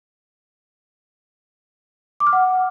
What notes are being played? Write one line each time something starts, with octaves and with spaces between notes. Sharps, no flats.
D6
F6
F#5